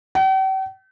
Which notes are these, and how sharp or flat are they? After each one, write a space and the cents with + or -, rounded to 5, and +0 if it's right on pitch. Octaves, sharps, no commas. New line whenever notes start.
G5 -45